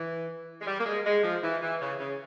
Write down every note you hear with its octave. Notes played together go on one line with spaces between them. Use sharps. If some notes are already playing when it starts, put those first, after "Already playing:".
Already playing: E3
G#3
G3
A#3
G#3
G#3
F3
E3
E3
C#3
C#3